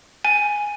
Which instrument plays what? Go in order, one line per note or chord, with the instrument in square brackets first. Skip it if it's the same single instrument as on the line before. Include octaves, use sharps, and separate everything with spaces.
[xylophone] G#5